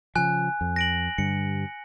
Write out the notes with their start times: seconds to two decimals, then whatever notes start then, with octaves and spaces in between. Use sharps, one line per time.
0.15 C#3 F3 G#5 F#6
0.61 F2
0.76 A#6 D7 F#7
1.18 G2 D3 G3 C#7